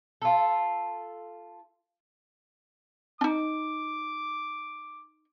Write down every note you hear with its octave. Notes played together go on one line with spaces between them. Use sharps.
F4 A4
D4 D#4 D6